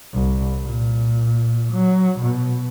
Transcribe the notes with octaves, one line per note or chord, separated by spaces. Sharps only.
C2
A#2
F#3
B2